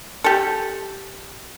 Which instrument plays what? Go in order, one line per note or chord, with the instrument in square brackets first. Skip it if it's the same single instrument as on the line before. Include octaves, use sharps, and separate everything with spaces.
[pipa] G4 A4